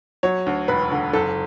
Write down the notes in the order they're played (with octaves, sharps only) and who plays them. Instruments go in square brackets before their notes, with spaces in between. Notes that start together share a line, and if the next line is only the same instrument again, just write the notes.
[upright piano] F#3 C#5
D2
E1 B4
D3
F#1 A4